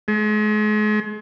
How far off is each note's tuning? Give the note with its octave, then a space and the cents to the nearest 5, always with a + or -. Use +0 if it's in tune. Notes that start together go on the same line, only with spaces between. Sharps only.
G#3 +40